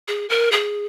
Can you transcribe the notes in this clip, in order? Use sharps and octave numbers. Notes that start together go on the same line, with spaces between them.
G#4
A#4
G#4